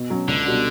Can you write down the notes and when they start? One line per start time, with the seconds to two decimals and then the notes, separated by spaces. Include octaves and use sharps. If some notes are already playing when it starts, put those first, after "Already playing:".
Already playing: B2
0.10 F#3 C#4
0.28 C#2 D3
0.45 B2 G3 D4 F#4